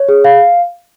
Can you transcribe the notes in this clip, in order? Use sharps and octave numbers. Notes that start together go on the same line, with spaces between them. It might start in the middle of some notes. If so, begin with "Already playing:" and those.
Already playing: C#5
G#4
F5